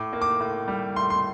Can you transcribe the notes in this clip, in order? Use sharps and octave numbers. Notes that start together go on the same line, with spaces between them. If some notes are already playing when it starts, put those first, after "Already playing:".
Already playing: A2 D6
A#3
D6
A2
G3
A2 C6
C6